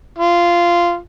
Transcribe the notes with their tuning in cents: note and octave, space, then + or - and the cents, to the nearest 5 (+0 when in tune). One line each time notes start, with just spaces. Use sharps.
F4 -10